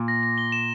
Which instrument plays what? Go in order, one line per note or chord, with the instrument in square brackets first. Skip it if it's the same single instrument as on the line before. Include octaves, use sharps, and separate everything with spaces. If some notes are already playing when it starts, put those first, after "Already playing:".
Already playing: [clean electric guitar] A#2
[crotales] A#6
A#6
G7
E7